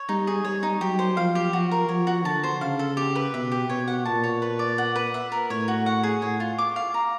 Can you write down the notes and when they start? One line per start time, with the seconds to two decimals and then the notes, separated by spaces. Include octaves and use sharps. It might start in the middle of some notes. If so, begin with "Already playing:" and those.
Already playing: C#5
0.09 G3 D#4
0.27 G#4
0.44 G3 C#5
0.63 D#4
0.81 F#3 G4
0.99 C5
1.17 F3 F5
1.35 G4
1.53 F3 F#4
1.71 A#4
1.89 F3 C#5
2.07 F#4
2.25 D3 A5
2.44 C5
2.61 C#3 F5
2.79 A4
2.97 G4
3.15 B4
3.33 B2 E5
3.52 G4
3.70 B2 C#5
3.88 F#5
4.05 A#2 A5
4.24 C#5
4.42 B4
4.59 D5
4.78 F#5
4.96 B4
5.14 E5
5.32 A#4
5.50 A2 C#5
5.68 F#4
5.86 F#5
6.03 G#4
6.22 A2 C#5
6.40 F4
6.58 D6
6.76 F5
6.94 A#5